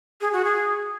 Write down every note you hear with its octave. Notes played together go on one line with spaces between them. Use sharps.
G#4
F#4
G#4